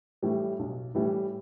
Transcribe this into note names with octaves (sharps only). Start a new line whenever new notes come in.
A2 E3 G3
B1
A2 E3 G3